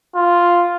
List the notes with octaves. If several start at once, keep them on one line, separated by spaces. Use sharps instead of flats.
F4